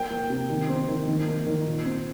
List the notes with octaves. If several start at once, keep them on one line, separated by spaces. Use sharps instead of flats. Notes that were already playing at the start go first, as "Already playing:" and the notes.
Already playing: A#3 G5
A#3
C3
D#3
C4
D#3
D#3
A#3
D#3
A#2
C4